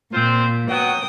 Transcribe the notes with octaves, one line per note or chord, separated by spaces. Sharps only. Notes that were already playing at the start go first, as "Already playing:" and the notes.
A#2 C4 F4 C5
F#3 B3 F#4 G5 D#6